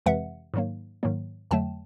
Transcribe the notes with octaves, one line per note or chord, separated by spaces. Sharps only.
F2 C3 E3 G#3 E5 F#5
G#2 D#3 F#3 A#3
G#2 D#3 F#3 A#3
F2 D3 F#3 A3 G5 A5